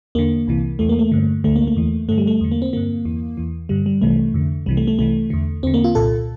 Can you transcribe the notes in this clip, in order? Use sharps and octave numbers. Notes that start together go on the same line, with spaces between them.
E2 D3 A#3
C2 C3 E3
E2 E3 A3
A#3
A3
G2 D3
D2 D3 A3
A#3
A3
E2 E3
G2 D3 A3
G3
A3
E2 D3
A#3
C4
G2 D3 A#3
E2 E3
E2 E3
G2 D3 G3
G3
C2 C3 E3 A3
F2 D3
C2 C3 E3 G3
A3
A3
C2 C3 E3 A3
E2 D3
E2 D3 C4
A#3
F4
C2 A#2 A4